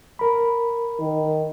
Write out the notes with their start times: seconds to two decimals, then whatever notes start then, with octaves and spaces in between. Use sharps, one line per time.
0.19 A#4 B5
1.00 D#3